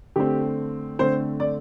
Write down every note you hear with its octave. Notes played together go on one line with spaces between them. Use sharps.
D3 A3 C4 G4
D3 A3 C4 C5
D5